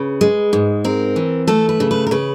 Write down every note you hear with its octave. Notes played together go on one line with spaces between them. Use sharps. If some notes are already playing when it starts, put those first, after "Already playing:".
Already playing: C#3 B4
G#3
G#2
C4 A#4
E3
A3 A4
B4
C#3
B4
A#4
C#3 B4